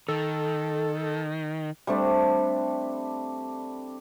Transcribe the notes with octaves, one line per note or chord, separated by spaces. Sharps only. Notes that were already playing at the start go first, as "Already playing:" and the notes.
D#3 A4
G3 A3 C4 D4